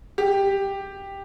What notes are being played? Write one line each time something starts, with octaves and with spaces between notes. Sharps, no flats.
G4